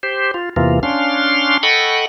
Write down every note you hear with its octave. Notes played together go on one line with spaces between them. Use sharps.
G4 C5
F4
E2 C3 E3 A#3 F4
C#4 D4 F5 C6
A4 D#5 F#5 G5 B5 C#6